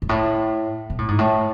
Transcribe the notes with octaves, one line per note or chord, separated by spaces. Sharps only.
G#2
A2
B2
A2
G#2
A2